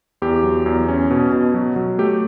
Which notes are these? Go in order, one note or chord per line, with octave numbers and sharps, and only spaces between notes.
E2 G4
F#3
E2
C#4
B2
B2
F#3
F#3
A3 G4